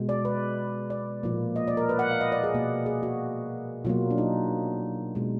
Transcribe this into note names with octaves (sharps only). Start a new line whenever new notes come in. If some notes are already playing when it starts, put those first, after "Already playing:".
Already playing: B2 G#3
D5
B4
D5
A#2 F3 A#3
D#5
D5
A#4
B4
F#5
F5
D#5
D5
G#4
B2 A#3
G#4
F#4
B2 F#3 A#3 F4
D4
D#4
B2 G#3